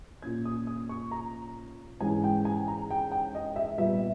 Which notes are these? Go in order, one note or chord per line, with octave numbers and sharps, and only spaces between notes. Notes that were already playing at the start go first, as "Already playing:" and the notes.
A#2 A#3 C#4 G#6
D#6
D#6
C#6
A#5
G#2 E3 G#3 C#4 G#5
G5
G#5
A#5
G5
G5
D#5
E5
A#2 G3 B3 E5